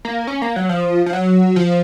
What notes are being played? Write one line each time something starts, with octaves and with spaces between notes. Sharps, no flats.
A#3
C#4
A#3
F#3
F3
F3
F#3
F3